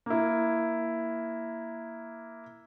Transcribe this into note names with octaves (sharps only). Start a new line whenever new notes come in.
A#3 E4